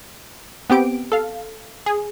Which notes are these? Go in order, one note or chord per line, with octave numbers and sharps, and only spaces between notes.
B3 C4 G4 D7
A4 F5
G#4